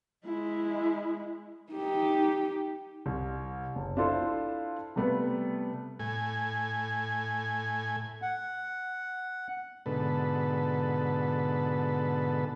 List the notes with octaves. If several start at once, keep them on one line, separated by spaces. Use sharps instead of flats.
G#3 E4
D#4 G4
C2
F#1
D4 E4 F4 A4 C5
C3 G3 A3 B3 A4 B4
A2 G#5
F#5
G#2 B2 D3 A4 B4